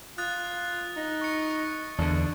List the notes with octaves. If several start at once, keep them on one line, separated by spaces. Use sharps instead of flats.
F4 D#6 F#6 A6
D#4
C#6 C#7
E2 D3 D4